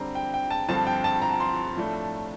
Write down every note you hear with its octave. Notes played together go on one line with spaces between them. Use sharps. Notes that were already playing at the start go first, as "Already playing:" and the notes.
Already playing: D3 G3 C4 A#5
G5
G5
A5
G2 D3 F3 C4 A5
G5
A5
A#5
C6
A2 F3 A3 D4